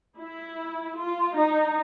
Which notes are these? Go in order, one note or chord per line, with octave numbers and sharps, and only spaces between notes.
E4
F4
D#4